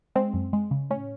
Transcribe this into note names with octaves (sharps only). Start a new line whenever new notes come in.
G#3 C4
F#2
G#3
C#3
A2 C#4